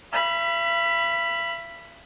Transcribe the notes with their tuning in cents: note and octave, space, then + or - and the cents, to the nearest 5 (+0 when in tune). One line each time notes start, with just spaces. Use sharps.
E5 +45 B5 +0